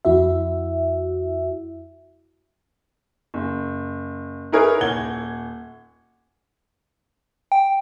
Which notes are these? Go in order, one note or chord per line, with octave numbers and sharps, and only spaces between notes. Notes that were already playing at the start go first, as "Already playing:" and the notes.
F2 E4 F#4 E5
F#1
D#4 E4 G#4 A#4 B4 C#5
D#1 F#5 G#6 G7
G5